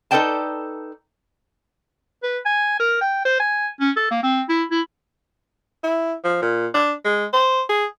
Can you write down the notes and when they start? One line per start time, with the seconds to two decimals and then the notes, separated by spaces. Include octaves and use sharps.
0.11 D#4 A4 B4 D5 G5 A5
2.23 B4
2.45 G#5
2.80 A#4
3.01 G5
3.25 C5
3.40 G#5
3.81 C#4
3.96 A4
4.11 A#3
4.23 C4
4.49 E4
4.71 E4
5.83 E4
6.24 F3
6.42 A#2
6.74 D4
7.05 G#3
7.33 C5
7.69 G#4